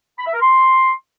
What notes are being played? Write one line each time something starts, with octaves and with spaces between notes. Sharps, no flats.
B5
E5
A#4
C6